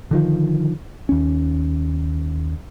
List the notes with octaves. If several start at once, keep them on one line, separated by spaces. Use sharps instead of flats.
D3 D#3 F3
D#2 C#4